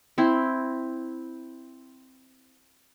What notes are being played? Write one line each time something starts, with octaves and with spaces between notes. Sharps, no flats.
C4 E4